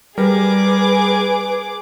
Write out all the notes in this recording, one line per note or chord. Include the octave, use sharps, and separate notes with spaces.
G3 G#4 A#4 B4 D6